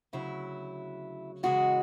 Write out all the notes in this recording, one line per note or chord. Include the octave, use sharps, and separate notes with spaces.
D2 C#3 F#3 E4
F#2 C#3 E3 G#3 C#4 F#4